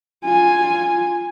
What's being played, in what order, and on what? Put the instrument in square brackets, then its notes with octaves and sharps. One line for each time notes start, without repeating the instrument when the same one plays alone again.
[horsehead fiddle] F4 G#5